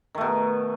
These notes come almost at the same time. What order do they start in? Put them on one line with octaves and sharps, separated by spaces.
D#3 A3 B2